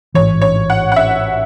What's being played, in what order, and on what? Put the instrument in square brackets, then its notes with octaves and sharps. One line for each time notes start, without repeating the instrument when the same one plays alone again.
[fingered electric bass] A1 G#2 E3 [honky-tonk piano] C#5
[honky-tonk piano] C#5
F#5
F#5
E5